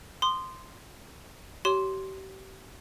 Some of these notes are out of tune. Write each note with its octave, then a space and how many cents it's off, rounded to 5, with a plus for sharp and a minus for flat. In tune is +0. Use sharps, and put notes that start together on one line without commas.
C6 -10 D#6 -35
G4 -35 C#5 +20 C6 +0